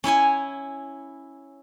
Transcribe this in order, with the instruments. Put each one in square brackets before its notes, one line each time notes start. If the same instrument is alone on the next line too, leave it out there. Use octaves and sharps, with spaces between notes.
[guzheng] C#4 E4 C#5 G#5